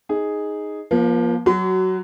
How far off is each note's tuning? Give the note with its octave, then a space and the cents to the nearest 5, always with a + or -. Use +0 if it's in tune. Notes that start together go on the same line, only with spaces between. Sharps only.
D#4 +0 G#4 +0
F3 +0 A#3 +40
F#3 +10 F#4 +20 C6 -40